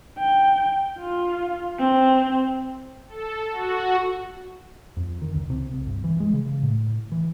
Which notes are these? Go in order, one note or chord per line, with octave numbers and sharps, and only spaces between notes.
G5
F4
C4
A4
F#4
F2
D#3
C#2
C3
C2
G1
E3
G#3
C#3
A2
E3